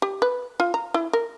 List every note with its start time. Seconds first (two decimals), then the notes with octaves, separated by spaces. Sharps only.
0.02 G4
0.22 B4
0.60 F4
0.74 A#5
0.94 E4
1.13 A#4